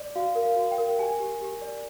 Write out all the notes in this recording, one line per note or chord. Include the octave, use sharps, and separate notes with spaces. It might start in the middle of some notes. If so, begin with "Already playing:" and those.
Already playing: D5
F#4 F5
A#4
F5
F#4
G5
A#4
G4 G#5
G4
G4
D5